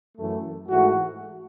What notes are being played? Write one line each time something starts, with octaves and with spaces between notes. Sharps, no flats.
F#2 E3 A3
G#2 E3 A3 F#4